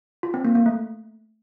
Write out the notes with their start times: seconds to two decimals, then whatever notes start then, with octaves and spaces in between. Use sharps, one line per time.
0.23 F4
0.34 C4
0.45 A#3
0.55 A#3
0.66 A3